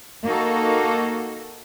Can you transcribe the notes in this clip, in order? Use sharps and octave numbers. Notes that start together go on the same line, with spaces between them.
A#3 D#4 F#4 A4